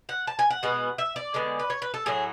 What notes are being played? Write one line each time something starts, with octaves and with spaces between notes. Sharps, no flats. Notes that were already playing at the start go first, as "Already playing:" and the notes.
F#5
A5
G#5
F#5
B2 G#3 B3
E5
D5
D3 G#3 B3
B4
C#5
B4
A4
A2 F#3 A3 G#4